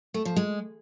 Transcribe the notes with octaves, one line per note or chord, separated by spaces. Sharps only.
A3
F3
G#3